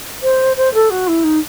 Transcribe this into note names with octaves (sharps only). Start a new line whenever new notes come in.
C5
C5
A4
F#4
E4
D#4